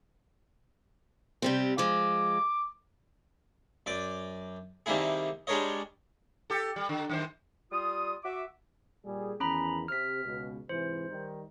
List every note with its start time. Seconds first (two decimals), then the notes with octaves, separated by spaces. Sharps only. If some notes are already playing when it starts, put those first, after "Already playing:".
1.42 C3 G3 C4
1.78 F3 G#3 D6
3.86 F#2 D5 D6
4.86 C3 D#3 G3 A#3 E4 G#4
5.47 G3 G#3 D4 A#4 C#5 D#5
6.50 G4 A4
6.76 G3
6.89 D3
7.10 F#2 D#3 C5
7.72 G3 F4 D#6
8.24 F#4 E5 D6
9.04 A#2 G3 G#4
9.40 E2 D#3 C#4 A#5 B5
9.88 C3 F6 B6
10.24 C#2 B2
10.69 G#2 C3 E3 C5
11.10 D#3 G3 D#4